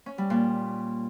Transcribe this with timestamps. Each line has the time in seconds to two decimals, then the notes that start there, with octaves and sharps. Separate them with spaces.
0.06 C#4
0.18 G3
0.30 A#2